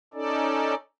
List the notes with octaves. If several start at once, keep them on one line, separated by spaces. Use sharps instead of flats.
C#4 D#4 A4 D5